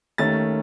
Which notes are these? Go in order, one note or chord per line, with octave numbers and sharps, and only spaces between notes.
D#2 D#3 A3 C#4 A6